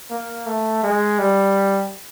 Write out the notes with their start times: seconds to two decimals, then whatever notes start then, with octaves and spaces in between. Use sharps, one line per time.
0.10 A#3
0.46 A3
0.83 G#3
1.18 G3